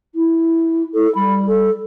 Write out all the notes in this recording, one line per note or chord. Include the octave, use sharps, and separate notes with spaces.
E4
E4 A4
G3 B5
A4